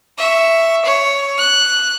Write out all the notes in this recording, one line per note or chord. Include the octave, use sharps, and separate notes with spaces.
E5 C#6
C#5
F#6